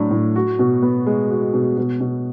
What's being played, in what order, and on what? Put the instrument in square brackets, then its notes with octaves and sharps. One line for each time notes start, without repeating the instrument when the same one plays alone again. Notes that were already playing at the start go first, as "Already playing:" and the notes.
Already playing: [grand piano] A2 F#3 D4
A2
F#4
B2
B3
G#3
F#4
B2
B2
B2